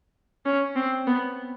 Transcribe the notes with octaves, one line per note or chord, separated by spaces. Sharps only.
C#4
C4
B3